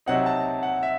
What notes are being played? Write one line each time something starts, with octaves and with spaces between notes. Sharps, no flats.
C3 F#3 C4 D#4 F#5
A5
F#5
E5